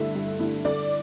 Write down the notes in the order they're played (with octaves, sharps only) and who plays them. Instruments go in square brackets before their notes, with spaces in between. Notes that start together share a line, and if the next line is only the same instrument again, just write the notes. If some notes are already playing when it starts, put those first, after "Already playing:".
Already playing: [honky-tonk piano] G2 D3 A3 E4 E5
G2
D3 A3 E4
D3 D5